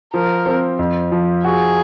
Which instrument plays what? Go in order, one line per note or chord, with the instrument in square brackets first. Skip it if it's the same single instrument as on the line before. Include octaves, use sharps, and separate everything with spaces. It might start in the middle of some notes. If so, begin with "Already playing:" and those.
[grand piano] F3 [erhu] A#4
[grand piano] C4
F2
F3
[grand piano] F#4 [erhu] G#4